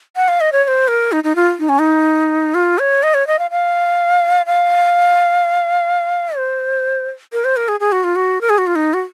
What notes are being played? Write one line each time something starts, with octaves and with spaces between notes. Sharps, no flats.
F#5
F5
D#5
C#5
C#5
C5
A#4
D#4
D#4
F4
D#4
C#4
D#4
F4
C#5
D#5
C#5
D#5
F5
F5
F5
C5
A#4
C5
A#4
G#4
G#4
F#4
F4
F#4
A#4
G#4
F#4
F4
D#4
F#4